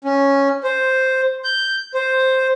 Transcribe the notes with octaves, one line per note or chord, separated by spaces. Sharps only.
C#4
C5
G6
C5